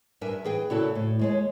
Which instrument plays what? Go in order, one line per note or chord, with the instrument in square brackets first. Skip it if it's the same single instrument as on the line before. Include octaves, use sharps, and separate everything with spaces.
[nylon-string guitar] G2 D4 A#4 E5 G#5
E3 G#4 G5
A#2 C#3 E4 F#4 A4 A5
A2
D#2 G#3 C#5